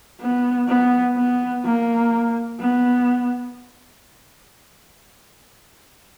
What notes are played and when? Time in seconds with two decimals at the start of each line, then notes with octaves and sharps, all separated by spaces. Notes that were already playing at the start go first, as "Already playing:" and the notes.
0.21 B3
0.69 B3
1.17 B3
1.65 A#3
2.61 B3